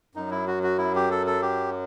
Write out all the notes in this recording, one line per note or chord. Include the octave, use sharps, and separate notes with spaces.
F#2 F#3 D#4
E4
F#4
F#4
E4
G4
A4
A4
G4